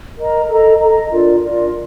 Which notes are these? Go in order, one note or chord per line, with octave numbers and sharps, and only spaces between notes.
A#4 D#5 A#5
A4 D#5 A#5
A4 D#5 A#5
D4 F4 A#4 D5
D4 F4 A#4 D5